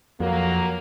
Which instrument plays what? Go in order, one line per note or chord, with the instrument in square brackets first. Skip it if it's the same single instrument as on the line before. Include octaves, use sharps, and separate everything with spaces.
[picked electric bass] F2 [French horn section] F#3 A#3